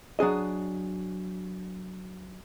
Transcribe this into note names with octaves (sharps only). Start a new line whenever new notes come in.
F#3 D4 G#4 D#5